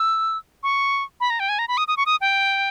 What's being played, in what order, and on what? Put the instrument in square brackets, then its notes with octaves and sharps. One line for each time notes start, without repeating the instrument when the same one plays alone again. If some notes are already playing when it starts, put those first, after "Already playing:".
Already playing: [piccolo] E6
C#6
B5
A#5
G5
G#5
A#5
B5
D#6
D#6
C#6
D#6
G5